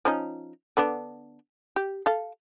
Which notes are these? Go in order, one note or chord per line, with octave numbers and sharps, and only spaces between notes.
F3 C#4 D#4
D3 B3 D4
G4
A4 F5